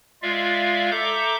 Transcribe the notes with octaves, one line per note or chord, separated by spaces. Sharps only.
G#3 F4 D5 E5 F5
A4 E5 A#5 D6 G6